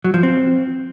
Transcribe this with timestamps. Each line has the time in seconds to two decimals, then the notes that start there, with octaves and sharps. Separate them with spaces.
0.04 F#3
0.14 F3
0.23 C4